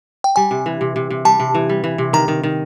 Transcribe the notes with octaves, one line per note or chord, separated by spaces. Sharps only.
G5
G3 G#5
C3
E3
C3
C3
C3
G3 A5
C3
E3
G3
E3
C3
D#3 A#5
D#3
D#3